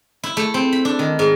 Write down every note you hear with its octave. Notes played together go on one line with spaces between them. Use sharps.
E4
A3
C4
B5
D4
D#3
G#2